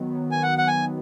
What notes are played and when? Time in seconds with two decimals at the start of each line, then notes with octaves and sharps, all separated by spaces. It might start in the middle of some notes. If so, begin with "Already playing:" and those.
Already playing: D#3 F#3 B3
0.32 G#5
0.43 F#5
0.58 F#5
0.68 G#5